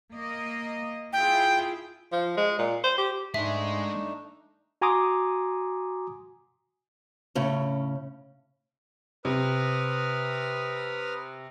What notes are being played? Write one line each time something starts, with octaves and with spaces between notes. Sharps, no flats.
A#3 D#5
E4 F4 G#4 G5
F3
G#3
A#2
C5
G4
G#2 G#3 A3 D4 D#4 E5 C6
F#4 G#5 A#5 C6 D6 D#6
A2 C#3 C#4
C3 B4 D#6 F6